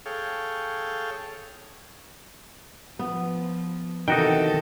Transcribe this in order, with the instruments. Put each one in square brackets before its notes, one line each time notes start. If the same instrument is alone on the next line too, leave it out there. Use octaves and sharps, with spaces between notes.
[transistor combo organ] G#4 A4 C#5 F5 G5
[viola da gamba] F3 [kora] B3
[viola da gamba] C3 E3 A4 [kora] D#3 [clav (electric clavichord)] D#4 F#4 G5